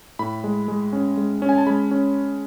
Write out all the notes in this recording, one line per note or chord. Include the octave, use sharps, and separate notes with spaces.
A2 B5
G#3
G#3
C#4
G#3
C#4
G#5
A5
G#3 B5
C#4